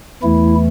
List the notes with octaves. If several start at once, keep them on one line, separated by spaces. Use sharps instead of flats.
E2 E3 A3 E4